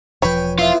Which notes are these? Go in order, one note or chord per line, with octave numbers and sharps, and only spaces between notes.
E1 F3 B4 C#5 G5 G#5
B3 E4 F4